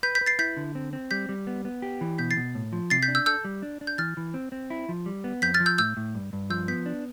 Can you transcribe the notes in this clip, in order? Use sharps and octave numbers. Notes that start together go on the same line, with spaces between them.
B4 G6 B6
G6 B6
B4
A6 C7
E4 G6 B6
D3
C4
C4
G3 G6 B6
G3
B3
B3
G4
E3
B2 G6 B6
A6 C7
B2
A2
F3
C3 A6 C7
G6 B6
D4
E6 G6
A4 E6 G6
G3
D4
D4
G6
E3 F6 A6
E3
C4
C4
E4
F3
G3
B3
F2 G6 B6
F6 A6
F3
E6 G6
A2 E6 G6
A2
G2
G2
F3 E6 G6
B3 G6 B6
D4